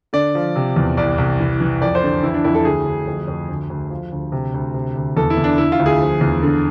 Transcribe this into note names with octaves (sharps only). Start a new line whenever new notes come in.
D3 D5
F3
C3
E2
C2 D5
C2
E3
E3
F2 D5
C5
D3
E3 E4
D4
F2 E4
A4
D2 G#4
D2
F2
F2
D2
D2
F3
D2
C3
D2
C3
D2
E2 A4
E4
E2
D4
D3 E4
F4
D2
G#4
F3
E2
D3